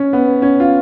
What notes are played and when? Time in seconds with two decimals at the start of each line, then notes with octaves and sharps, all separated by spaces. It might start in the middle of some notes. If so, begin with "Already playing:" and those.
Already playing: C#4
0.13 B3
0.42 C#4
0.60 F4